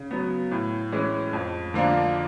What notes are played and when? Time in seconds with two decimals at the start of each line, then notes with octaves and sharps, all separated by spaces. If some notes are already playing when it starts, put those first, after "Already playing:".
Already playing: C#3
0.11 F#3 B3
0.51 A2
0.92 E3 G#3 C#4
1.33 F2
1.74 D3 F3 A#3 D4